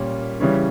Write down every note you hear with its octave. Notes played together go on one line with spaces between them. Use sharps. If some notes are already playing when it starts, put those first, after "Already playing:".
Already playing: A#2 G3 C#4
C#3 E3 G3 C#4